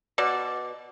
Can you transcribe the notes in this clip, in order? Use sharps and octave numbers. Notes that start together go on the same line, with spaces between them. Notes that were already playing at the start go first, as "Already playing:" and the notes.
B2 D5